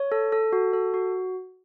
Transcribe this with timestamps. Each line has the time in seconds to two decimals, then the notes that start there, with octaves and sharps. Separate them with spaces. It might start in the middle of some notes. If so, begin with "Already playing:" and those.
Already playing: C#5
0.12 A4
0.32 A4
0.52 F#4
0.73 A4
0.94 F#4